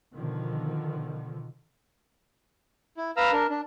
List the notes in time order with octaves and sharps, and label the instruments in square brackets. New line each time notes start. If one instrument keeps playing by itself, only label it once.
[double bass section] B2 D3 D#3 F3
[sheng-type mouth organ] E4
B4 F5 A#5 E6 F6
D4 A#4
D4